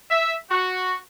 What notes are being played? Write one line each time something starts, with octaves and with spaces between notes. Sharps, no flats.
E5
F#4